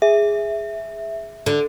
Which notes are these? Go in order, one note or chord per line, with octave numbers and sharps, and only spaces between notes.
G#4 E5
D3